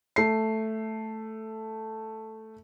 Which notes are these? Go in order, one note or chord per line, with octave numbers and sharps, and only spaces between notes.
A3 C7